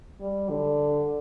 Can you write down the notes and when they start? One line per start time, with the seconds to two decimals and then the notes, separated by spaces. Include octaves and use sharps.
0.21 G3
0.49 D3